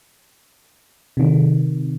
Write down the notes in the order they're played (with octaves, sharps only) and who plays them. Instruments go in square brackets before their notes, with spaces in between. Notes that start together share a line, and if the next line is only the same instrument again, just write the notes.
[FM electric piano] C3 D#3